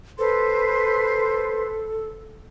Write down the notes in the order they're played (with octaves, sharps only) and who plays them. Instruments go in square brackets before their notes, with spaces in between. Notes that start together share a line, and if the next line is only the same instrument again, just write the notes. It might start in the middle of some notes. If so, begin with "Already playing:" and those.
[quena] A4 [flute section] B4 C5 C6